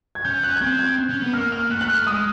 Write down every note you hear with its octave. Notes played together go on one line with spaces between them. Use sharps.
G#6
C#4 G6
F#6
G#6
C4 G6
G#6
G6
C#4
B3
A#3 F6
F6
A3 F#6
F#6
A3 F6
G#3 D#6